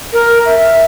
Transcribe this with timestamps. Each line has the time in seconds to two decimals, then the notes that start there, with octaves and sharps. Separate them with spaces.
0.13 A#4
0.46 E5